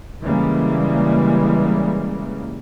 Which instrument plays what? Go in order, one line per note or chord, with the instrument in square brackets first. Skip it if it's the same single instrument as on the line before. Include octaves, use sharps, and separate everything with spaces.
[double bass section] C#3 E3 G3 G#3 A#3